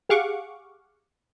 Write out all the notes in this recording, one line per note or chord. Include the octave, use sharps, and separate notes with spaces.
G4 G#4 F5 F#5 C#6 D6